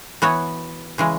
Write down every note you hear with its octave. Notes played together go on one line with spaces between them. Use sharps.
E3 B3 F#4 C#5
C#3 E3 G#3